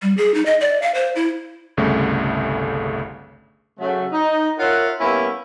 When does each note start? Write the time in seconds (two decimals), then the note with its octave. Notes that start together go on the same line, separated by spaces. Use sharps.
0.03 G3
0.17 G#4
0.34 D#4
0.46 D#5
0.61 D5
0.82 F5
0.95 C5
1.16 E4
1.77 G1 C2 C#3 A3
3.79 C#3 F#3 A3
4.12 D#4
4.59 F4 A#4 C#5 E5 F#5
5.00 G3 A#3 B3 C#4 E4